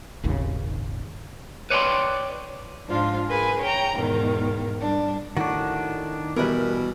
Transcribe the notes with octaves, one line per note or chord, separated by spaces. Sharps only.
D#1 G#1 D#2 C#3
B4 C#5 D5 E5 G5 C6
G#2 F3 D4 F4
G#4 A#4 B4 G#5
C#5 G5 A#5
E2 G#2 B2 D#3
G3 D4
A2 D#3 D4 F#4
B2 E3 G3 A#4 B4